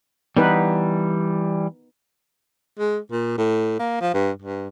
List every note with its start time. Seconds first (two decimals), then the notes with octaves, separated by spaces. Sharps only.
0.37 E3 G3 B3 D#4 B4
2.79 G#3
3.11 A#2
3.37 A2
3.79 A#3
4.01 F3
4.14 G2
4.42 G2